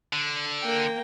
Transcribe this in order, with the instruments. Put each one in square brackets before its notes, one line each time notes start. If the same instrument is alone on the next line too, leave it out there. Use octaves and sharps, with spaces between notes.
[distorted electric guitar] D3
[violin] A#3 G5